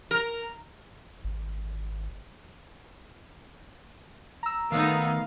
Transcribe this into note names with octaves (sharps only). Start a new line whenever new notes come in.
A#4
G#1
A#5 E6
D#3 A3 B3 D#4 F5